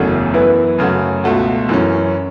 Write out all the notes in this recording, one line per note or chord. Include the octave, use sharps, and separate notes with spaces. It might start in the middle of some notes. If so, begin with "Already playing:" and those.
Already playing: F#1 E2 C#3 A3 F#4
F#2 E3 B3 E4 B4
F#2 C#3 A3 F#4
C#2 B2 A3 F#4
F#2 E3 C#4